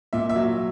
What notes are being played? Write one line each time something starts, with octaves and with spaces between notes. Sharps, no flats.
A#2 E5
E5
F#3